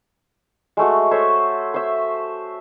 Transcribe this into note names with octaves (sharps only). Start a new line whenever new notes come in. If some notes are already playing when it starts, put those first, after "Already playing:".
G#3 A3 F#4
A4 C5 C#5 E5
C5 E5